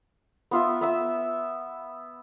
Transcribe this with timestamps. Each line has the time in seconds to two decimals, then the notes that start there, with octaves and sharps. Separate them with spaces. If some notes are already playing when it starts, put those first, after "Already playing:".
0.51 B3 F4 E5
0.81 B3 E5 E6